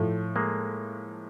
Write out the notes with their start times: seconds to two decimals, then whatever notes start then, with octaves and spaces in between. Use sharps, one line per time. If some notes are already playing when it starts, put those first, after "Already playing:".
Already playing: A2 F3 A3
0.36 G#3 A#3